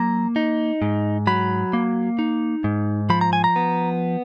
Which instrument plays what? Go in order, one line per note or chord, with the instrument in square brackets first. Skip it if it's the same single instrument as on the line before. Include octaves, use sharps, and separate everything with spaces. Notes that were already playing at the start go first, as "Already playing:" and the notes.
Already playing: [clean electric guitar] F#3 A#3 A#5
D#4
G#2
F#3 B5
A#3
D#4
G#2
F3 B5
A#5
G#5
A#5
B3